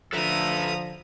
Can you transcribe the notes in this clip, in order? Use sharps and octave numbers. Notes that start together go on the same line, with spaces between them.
D3 F3 A4 B4 E5 A#5 D#6